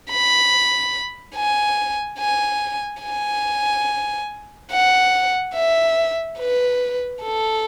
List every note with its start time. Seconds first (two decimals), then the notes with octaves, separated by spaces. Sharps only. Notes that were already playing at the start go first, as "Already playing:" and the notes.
0.10 B5
1.36 G#5
2.20 G#5
3.03 G#5
4.71 F#5
5.55 E5
6.39 B4
7.22 A4